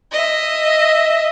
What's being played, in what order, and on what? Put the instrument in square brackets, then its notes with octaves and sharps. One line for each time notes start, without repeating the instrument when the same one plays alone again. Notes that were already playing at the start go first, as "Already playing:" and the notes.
[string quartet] D#5 E5